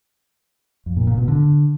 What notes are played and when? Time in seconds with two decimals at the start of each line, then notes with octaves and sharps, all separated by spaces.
0.86 F2
0.97 A#2
1.07 A#2
1.18 B2
1.28 D3